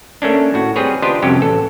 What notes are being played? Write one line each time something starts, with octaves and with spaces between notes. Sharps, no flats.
A3 A#3 C#4 D4
A2 F#4
G3 C4 G#4 B4 C#5
D4 F4 G4 B4 C5 D#5
C2 F2 F#3 C#4 G4
A1 A4